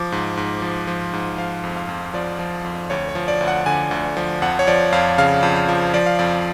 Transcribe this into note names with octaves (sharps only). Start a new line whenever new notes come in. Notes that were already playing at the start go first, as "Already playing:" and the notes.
Already playing: F3 D6
G#2
G#2
F3
F3
G#2
F3 F5
F2
F5
F2
F3 D5
F3
F2
D2 C#5
C#5
F3
D5
D2
F#5
D3 G#5
D2
F3
F2 F#5
C#5
F3 D5
F2 F5
C#3 F5
F2
F5
F3
F3 D5
F5
F2 D5